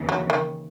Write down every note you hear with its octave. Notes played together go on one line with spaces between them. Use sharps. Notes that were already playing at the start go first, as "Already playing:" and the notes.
Already playing: D#2 C#3 E3
F#3
D#3